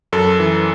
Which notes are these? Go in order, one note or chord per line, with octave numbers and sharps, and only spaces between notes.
F#2 A4
E3